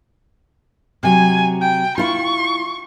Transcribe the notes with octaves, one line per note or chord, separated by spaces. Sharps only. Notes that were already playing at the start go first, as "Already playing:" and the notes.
C3 F#3 G#5
G5
E4 F4 C#6